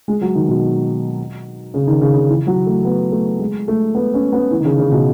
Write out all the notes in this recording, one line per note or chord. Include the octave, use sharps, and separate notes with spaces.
G#3
F#3
D#3
B2
C#3
D#3
C#3
C#3
E3
F#3
A3
B3
A3
G#3
A3
B3
C#4
B3
E3
D#3
C#3
C#3
B2